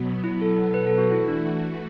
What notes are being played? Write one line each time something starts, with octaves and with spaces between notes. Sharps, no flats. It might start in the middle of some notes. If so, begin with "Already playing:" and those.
Already playing: B2 F#3 B3
E4
A4
B4
A4
F#4
E3 A3 E4 F#4
D4